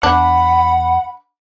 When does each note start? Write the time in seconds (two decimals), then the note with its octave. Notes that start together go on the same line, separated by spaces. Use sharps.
0.03 E2 D4 F#5 B5